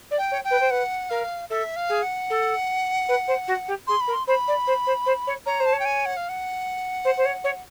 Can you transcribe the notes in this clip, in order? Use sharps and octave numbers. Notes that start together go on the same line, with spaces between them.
D5
G5
C#5
G5
B4
C5
B4 F#5
A#4 F5
A4 E5
F5
G#4
F#5
A4
B4
C5
F#4
G4
G#4 C6
B5
A#4
C6
C5 B5
D5
C5
C5
C5
C#5
C#5 A#5
C5
A5
C#5
G5
G#5
F#5
F5
F#5
C5
C5
C#5
C#5